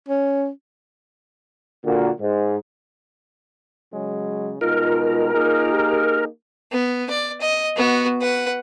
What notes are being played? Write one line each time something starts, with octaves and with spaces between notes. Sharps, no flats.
C#4
A#2 D3 A#3 F#4
G#2
C#3 F#3 G#3
B2 G#3 D#4 F4 A#4
A#3 D#4 G#4
G4
B3
D5
D#5
B3 F#4
B4 F#5